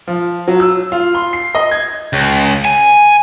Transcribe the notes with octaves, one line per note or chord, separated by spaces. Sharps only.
F3
F#3
E6
F4
C6
C7
D#5
G#6
C#2
G#5